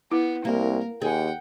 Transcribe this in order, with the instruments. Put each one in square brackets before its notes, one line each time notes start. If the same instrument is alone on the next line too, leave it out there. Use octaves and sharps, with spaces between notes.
[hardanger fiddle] B3 [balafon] E4
[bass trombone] C2 [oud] A#3 [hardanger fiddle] A#4
[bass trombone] D#2 [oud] G#4 [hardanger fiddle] F#5 G5